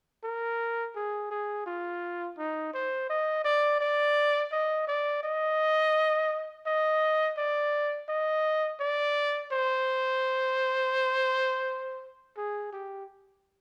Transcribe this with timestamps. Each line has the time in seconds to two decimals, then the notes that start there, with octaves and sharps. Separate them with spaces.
0.24 A#4
0.95 G#4
1.31 G#4
1.66 F4
2.38 D#4
2.74 C5
3.09 D#5
3.44 D5
3.80 D5
4.52 D#5
4.88 D5
5.23 D#5
6.66 D#5
7.37 D5
8.09 D#5
8.80 D5
9.52 C5
12.37 G#4
12.72 G4